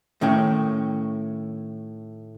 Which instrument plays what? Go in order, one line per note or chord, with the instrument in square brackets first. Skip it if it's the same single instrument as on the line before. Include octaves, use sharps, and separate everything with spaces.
[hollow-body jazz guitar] A2 D#3 A3 C#4 G5